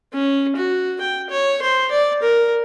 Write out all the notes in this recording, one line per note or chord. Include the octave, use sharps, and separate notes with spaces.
C#4
F#4
G5
C#5
C5
D5
A#4